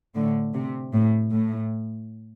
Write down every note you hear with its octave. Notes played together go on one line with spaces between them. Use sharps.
A2 D3
C3
A2
A2